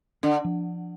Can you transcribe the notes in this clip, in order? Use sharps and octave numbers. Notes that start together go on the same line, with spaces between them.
D3 D4
F3